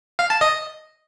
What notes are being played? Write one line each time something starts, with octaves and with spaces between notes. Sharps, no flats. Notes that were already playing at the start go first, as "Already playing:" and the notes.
F5
A5
D#5